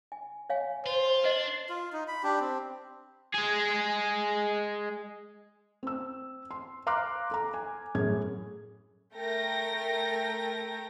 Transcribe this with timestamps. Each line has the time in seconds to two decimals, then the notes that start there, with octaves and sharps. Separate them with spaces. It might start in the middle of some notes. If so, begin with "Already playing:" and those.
0.12 G#5
0.50 C#5 F5 G#5
0.86 F4 C5
1.24 D4 B4 D#5
1.69 F4
1.93 D#4
2.08 B5
2.23 D4 G4
2.40 C4
3.34 G#3 G#4
5.83 C4 E6
6.51 C6
6.87 F5 A#5 C6 D6 F6 F#6
7.31 A4 A#5
7.54 G#5
7.95 F#2 A2 G#4 G#6
9.14 A3 A#4 G5 A#6